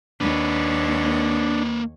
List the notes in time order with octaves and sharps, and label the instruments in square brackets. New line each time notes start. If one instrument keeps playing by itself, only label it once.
[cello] D#2 C#5 [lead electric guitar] A#3 B4 [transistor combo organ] D4